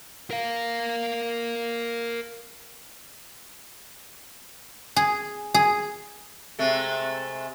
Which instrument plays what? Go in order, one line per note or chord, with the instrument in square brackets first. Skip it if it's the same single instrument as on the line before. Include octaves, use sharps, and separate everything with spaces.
[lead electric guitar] A#4 F5
[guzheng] G#4
G#4
[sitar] C3 G#3 A3